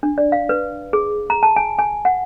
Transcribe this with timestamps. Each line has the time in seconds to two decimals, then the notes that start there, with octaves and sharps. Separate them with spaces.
0.03 D4
0.18 D5
0.32 F5
0.49 B4
0.93 G#4
1.30 A#5
1.43 A5
1.56 G#5
1.79 G#5
2.05 F#5